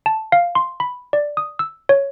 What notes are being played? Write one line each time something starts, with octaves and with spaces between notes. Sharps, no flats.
A5
F5
C6
B5
D5
D#6
E6
C#5